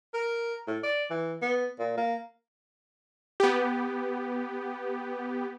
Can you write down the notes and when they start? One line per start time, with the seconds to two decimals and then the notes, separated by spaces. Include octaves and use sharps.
0.14 A#4
0.68 A2
0.83 D5
1.10 E3
1.42 B3
1.79 A#2
1.98 A#3
3.40 B3 G4